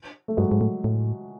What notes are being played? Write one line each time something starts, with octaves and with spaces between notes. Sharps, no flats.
A3
G2 F#3 G#3
G#2
A2
A2